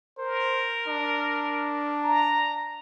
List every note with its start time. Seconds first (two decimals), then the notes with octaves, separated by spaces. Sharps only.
0.18 A#4 C5
0.88 D4
2.04 A#5